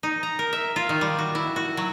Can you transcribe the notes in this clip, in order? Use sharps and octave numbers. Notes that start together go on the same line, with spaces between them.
D#4
A#5
A#4
E5
F4
D#3
G3
F#4
E4
F#4
F#3